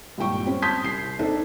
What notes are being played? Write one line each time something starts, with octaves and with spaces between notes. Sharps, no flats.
G#1 G2 A#2 G5 C#6
G3 C4 C#4 G4
A5 C6 D#6 G6 G#6 B6
C2 C7
C4 D4 D#4 A4